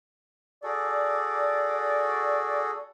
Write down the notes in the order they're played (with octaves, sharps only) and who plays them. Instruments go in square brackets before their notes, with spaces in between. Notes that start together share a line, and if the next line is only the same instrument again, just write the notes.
[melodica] F#4 G#4 A4 [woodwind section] D5